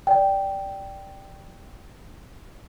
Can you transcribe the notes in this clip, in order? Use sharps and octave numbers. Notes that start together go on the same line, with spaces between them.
D5 G5